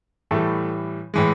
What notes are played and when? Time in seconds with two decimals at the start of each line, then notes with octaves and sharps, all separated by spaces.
0.31 A2 E3 G3 A3 A4
1.14 A2 E3 G#3